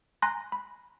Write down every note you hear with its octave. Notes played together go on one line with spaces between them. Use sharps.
G#5 A#5 C6 F#6 A#6
B5